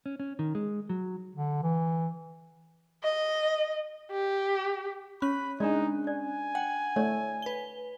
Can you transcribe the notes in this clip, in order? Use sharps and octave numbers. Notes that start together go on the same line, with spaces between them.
C#4
C#4
D#3
G#3
F#3
D3
E3
D#5
G4
C#4 B5 F#6
G#3 D4 D#4 D5
D5 G#5
F#5 G5
A3 C#5 D5
B4 G7